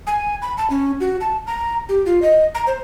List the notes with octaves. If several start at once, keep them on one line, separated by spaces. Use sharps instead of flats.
G#5
B5
A5
C#4
F#4
A5
A#5
G4
F4
D#5
A#5
C5